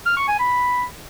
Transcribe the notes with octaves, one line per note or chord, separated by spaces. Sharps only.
F6
C#6
G#5
B5